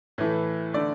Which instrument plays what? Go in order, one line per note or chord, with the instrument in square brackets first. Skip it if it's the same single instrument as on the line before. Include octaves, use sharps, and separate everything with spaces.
[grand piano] A2 E3 A3 B4
D3 A3 D5